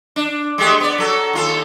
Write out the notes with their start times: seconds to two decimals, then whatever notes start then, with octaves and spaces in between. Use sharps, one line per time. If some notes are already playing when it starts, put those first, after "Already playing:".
0.16 D4
0.58 G#3 A3 G4
0.80 B3 D5
0.98 F#3 A4
1.33 D#2 F4 A4